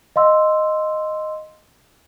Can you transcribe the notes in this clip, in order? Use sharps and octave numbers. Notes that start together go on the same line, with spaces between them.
D#5 F5 C6 E6